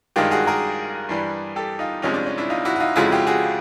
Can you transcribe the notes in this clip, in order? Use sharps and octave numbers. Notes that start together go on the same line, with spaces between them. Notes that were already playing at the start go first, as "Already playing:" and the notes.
G2 D#3 G#3 F4 G4
F#4 G#4
G#4 A#4
G2 E3 G3
G4 A4
D#4 F4
C2 C3 F3 G#3 C#4 D#4
D4
C#4
D4 E4
D#4 F4
E4 F#4
F#4
D#4 F4
F2 C#3 F3 G#3 E4 F#4
F4 G4
F#4 G#4